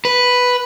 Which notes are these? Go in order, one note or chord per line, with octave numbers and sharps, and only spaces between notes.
B4